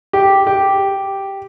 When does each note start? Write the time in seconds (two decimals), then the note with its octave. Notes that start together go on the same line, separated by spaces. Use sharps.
0.13 G4
0.47 G4